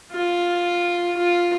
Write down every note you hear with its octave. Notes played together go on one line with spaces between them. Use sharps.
F4
F4